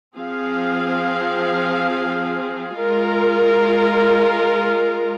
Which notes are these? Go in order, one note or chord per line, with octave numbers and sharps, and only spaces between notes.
F3 C4 G#4 F5
G#3 F4 A#4